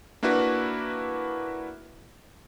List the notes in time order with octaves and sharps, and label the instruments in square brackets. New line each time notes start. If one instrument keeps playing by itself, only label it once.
[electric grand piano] A#3 D4 E4 F#4 B4